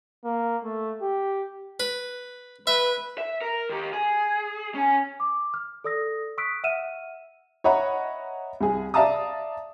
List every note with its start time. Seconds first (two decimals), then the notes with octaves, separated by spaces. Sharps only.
0.24 A#3
0.64 A3
1.02 G4
1.80 B4
2.67 B4 E5
3.18 E5
3.41 A#4
3.69 D#3 G4
3.93 G#4
4.75 C#4 G#5
5.20 D6
5.54 F6
5.84 A4 D5 D#6 E6 A#6
6.38 C#6 D#6 E6 F#6 B6 D7
6.64 E5 F#5 E6 F6 D#7 E7
7.64 C#5 D#5 E5 F#5 A#5 B5
8.61 C2 G#4
8.94 D5 E5 F5 A5 A#5 D#6